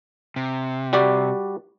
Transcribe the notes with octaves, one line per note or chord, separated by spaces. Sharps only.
C3
G3 F#4 D5